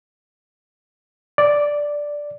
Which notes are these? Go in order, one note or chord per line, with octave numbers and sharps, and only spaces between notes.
D5